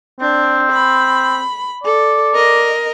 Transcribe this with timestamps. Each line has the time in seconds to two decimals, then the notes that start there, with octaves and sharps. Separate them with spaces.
0.21 C4 D4
0.70 B5
1.84 A4 D5
2.34 A#4 D#5